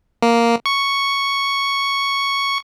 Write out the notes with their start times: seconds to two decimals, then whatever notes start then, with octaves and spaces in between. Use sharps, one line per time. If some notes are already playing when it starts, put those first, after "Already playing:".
0.22 A#3
0.66 C#6